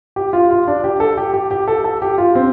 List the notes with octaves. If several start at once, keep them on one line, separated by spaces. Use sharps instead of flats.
G4
F4
F4
D4
G4
A4
G4
G4
G4
A4
A4
G4
F4
C4